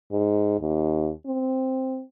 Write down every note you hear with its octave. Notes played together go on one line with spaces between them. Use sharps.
G#2
D#2
C4